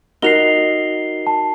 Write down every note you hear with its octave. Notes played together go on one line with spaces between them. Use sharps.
D#4 F#4 A#4 C7 F7 G7
A5